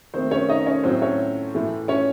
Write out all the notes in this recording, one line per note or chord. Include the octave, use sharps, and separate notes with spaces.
D#3 A3 C4 C5
C#4 C#5
D#4 D#5
C#4 C#5
A2 F#3 A3 C4 C5
C#4 C#5
A2 E3 A3
C#4 C#5